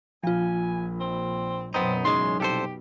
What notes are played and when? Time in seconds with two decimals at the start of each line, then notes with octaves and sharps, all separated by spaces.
0.23 A#1 F3 F4 G#5
1.00 C4
1.74 F#2 B2 B3 C4 D#4
2.05 E2 C#3 G#3 D#4 C6
2.40 C2 B2 G4 A4 C5